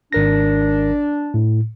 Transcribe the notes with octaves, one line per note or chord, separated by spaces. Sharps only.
G#1 D4 A#4 A#6
A2